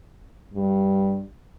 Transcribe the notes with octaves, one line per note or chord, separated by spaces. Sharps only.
G2